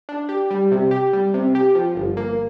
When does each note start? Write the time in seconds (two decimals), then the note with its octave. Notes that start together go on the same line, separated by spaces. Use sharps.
0.09 D4
0.29 G4
0.51 G3
0.71 C3
0.91 G4
1.13 G3
1.34 C3
1.55 G4
1.75 F3
1.95 G1
2.17 A#3